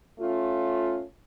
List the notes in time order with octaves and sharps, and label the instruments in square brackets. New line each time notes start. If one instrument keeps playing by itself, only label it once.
[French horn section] A3 C#4 F4